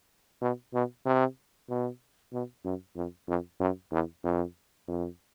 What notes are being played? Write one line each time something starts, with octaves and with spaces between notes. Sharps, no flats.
B2
B2
C3
B2
B2
F#2
F2
F2
F#2
E2
F2
F2